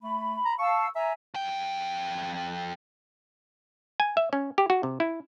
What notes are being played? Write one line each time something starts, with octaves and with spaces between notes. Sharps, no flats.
A3 B5
A#5
F5 A5 C#6 E6
E5 G#5 A#5
F2 G5
G#5
E5
C#4
G4
F#4
C3
E4